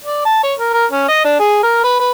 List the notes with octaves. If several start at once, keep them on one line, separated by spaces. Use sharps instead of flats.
D5
A5
C#5
A#4
A#4
C#4
D#5
D4
G#4
A#4
B4
B4